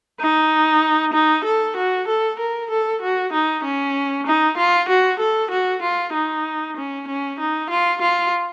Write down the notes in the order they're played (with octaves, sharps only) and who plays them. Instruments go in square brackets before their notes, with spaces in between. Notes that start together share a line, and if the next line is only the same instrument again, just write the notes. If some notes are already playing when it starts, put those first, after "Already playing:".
[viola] D#4
D#4
A4
F#4
A4
A#4
A4
F#4
D#4
C#4
D#4
F4
F#4
A4
F#4
F4
D#4
C#4
C#4
D#4
F4
F4